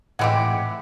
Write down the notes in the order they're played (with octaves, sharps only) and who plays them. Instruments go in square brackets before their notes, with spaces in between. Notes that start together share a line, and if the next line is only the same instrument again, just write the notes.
[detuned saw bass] A2 [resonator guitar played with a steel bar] E3 F#5 [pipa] G#3 C4 G4